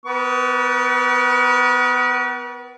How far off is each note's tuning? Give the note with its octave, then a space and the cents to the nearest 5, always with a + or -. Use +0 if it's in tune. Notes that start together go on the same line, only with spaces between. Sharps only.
B3 +30 B4 -40 C#6 +45